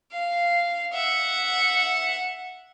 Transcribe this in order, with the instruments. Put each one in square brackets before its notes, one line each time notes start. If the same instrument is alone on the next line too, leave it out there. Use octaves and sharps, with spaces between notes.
[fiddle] F5
E5 F#5